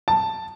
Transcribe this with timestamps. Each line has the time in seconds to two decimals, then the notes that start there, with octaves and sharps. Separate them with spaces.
0.08 A5